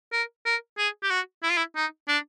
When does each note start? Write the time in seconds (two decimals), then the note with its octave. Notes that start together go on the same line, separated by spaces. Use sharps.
0.13 A#4
0.46 A#4
0.78 G#4
1.03 G4
1.11 F#4
1.43 E4
1.50 F4
1.57 E4
1.76 D#4
2.08 D4